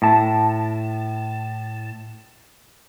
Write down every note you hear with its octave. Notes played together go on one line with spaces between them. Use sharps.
A2 A5